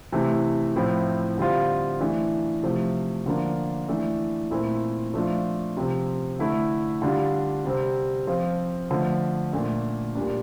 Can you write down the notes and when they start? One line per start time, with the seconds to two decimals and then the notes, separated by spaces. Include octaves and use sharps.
0.12 C3 E3 A3
0.76 A2 F3 C4 E4
1.38 D3 G3 C4 F4
2.00 E3 A3 D4
2.63 C3 F3 A3
3.26 D3 F3 A#3 D4 F4
3.88 E3 A3 D4
4.51 A#2 A3 C4 E4
5.14 F3 A3 D4 F4
5.77 C3 F3 C4
6.39 D3 A3 E4
7.02 D3 G3 D4 F4
7.65 C3 G3 C4
8.27 F3 C4 F4
8.90 D3 F3 A3
9.53 A#2 A3 D4
10.15 A#2 G3 D4